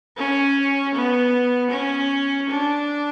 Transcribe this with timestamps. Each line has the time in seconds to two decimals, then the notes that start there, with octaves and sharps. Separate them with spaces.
0.17 C#4
0.94 B3
1.71 C#4
2.48 D4